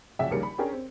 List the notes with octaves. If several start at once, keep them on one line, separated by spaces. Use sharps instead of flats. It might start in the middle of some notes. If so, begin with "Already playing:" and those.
A#1 C#3 F#3 E5 F#5 G5
A#1 D#2 C#3 G3 A#4 C#7
B5
C#4 D4 G4 G#4 A#4 C#5
C4